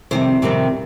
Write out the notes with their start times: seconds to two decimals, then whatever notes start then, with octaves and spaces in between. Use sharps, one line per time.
0.11 F2 C3 D#3 G3 C4 C5
0.42 F2 C3 D#3 G3 C4